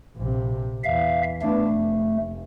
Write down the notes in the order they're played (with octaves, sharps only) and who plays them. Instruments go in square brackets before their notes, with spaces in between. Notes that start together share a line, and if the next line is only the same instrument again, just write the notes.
[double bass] A#1 C3
[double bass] E2 [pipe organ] E5 F5
[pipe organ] A3 [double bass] B3 D4
[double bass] F1